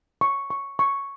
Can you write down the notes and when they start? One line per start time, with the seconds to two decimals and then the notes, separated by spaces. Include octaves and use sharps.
0.21 C#6
0.50 C#6
0.79 C#6